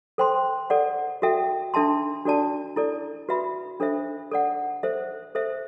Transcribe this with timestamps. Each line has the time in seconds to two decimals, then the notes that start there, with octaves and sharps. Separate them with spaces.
0.18 A4 C5 G5 C6
0.70 A4 D5 F#5
1.22 F#4 A4 E5 G5
1.74 D4 A4 E5 A5 C6
2.25 D4 F#4 A4 D5 A5
2.76 E4 A4 D5
3.29 F#4 B4 E5 B5
3.80 D4 A4 C5 E5
4.32 A4 D5 F#5
4.83 A4 C5 E5
5.35 A4 C5 E5